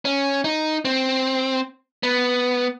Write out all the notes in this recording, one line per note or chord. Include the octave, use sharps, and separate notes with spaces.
C#4
D#4
C4
B3